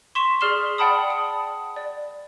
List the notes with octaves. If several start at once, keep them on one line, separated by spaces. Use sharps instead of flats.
C6 C#6 B6 E7
G#4 D5 F6 C7 E7 G7
D5 F#5 G5 A5 B5 D#6
D#6
D5